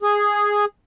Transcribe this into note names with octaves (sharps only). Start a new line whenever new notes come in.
G#4